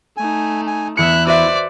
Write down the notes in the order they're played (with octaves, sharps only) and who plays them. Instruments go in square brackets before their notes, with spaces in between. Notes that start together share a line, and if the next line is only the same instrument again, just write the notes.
[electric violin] A3 D#4 [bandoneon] G#5
[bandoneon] G#5
[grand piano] E2 C#7 [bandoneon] E4 [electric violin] E5 F#6
[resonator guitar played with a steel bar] F#4 B4 E5 [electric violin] C5 D5